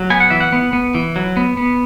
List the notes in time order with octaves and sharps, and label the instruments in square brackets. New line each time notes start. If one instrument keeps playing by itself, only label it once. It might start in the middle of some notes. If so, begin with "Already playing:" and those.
Already playing: [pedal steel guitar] F#3
B3 G#5
F#5
E3 E5
F#5
B3
B3
E3
F#3
B3
B3